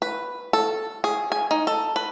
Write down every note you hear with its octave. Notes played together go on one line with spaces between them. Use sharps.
B4
A4
G#4
G#5
D#4
A4
B4